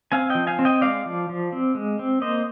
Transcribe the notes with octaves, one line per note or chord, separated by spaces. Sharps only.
C4 F5 G#5
F3 D#5 G5
F5 G#5
C4
D#5 G5
G#3 D5 F5
F3
F3
C4
G#3
C4
A#3 C5 D#5